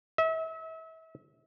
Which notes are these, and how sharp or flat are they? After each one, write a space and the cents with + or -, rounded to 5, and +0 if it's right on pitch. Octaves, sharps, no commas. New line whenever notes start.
E5 -35